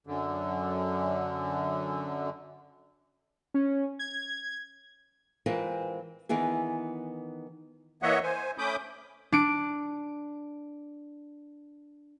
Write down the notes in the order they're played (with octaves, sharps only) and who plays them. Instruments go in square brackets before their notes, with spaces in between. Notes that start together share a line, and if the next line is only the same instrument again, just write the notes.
[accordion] F#2 D3
[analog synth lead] C#4
G#6
[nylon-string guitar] E3 G#3 C4 F4 A#4 B4
D#3 E3 B3 E4 G#4
[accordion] E3 A#3 C#5 D#5 E5 F#5
C5 G#5
A3 C#4 B5 D6 D#6 G6
[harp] D4 D7